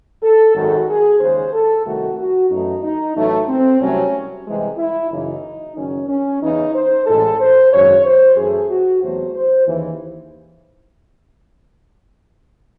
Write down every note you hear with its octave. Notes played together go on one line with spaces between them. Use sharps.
A4
G#1 F#2 D#3 G#3 F#4
G#4
D#2 C#3 G#3 C5
A4
C2 C3 D#3 A3 F#4
F#4
F#2 E3 A3 D#4
D#4
A1 A2 F#3 A3
C4
C2 C3 F#3 A3 C#4
C2 C3 E3 G#3
E4
F#1 F#2 C#3 E3 D#4
F#1 F#2 D#3 C#4
C#4
E2 C#3 E3 D#4
C5
A1 A2 G#3 A4
C5
G#1 F#2 C#3 C#5
C5
F#2 E3 A3 G#4
F#4
E2 C3 F#3 A3 C5
C5
D#2 C#3 E3